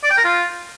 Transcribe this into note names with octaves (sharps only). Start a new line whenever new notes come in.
D5
G5
A#4
F4